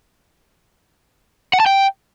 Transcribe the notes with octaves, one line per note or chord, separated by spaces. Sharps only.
F#5
A5
G5